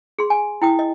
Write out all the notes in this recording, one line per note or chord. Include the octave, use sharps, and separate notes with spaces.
G#4 C6
G#5
E4 G5 D#6
D#5